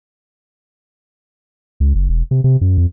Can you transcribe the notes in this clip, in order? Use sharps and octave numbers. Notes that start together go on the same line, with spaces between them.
C#2
F#1
E1
C3
C3
F#2
F2